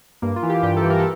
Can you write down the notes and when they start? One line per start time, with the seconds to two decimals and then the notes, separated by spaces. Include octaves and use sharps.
0.22 G2 A#3
0.36 F4
0.43 E3
0.49 G4
0.63 G2 G4
0.77 A4
0.83 E3
0.90 A#4
0.98 A4